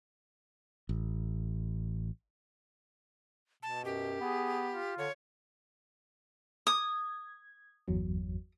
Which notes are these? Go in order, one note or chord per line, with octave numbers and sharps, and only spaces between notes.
A1
B2 A5
F#2 G4
B3 G#4
F4
D3 C#5
D#6 G#6
G1 E2 F#3